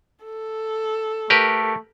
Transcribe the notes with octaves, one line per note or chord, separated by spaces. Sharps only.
A4
A3 G4 A#4 B4